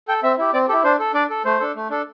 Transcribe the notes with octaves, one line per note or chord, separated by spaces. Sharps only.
A4 G5
C4 E5
E4 G4
C4 D5
E4 G4 A4
D4 C5
A4
D4 D5
A4
A3 C5
D4 A4
A3
D4 A4